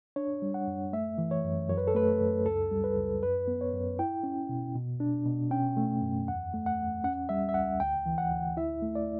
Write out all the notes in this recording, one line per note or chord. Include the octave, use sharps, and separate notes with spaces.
D4 C#5
G3
F#5
F#2
A3 E5
E3
C#5
F#2
F#2 C#5
B4
A4
A3 B4
F#2
C#2 A4
G3
B4
C#2
F#2 B4
B3
C#5
F#2
E4 G5
C#4
B2
B2
D4
B2
C#4 G5
A3
F#2
E2 F#5
A3
F#5
E2
C#4 F#5
G3 E5
E5
C#2 F#5
D2 G5
E3
F#5
D2
E4 E5
A3
D5